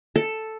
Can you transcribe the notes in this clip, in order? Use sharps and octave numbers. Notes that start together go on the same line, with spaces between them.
A4